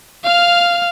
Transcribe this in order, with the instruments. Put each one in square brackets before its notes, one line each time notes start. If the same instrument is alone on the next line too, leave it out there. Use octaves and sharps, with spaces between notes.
[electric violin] F5 F6